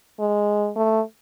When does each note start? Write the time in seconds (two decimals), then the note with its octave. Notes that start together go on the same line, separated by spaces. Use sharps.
0.20 G#3
0.76 A3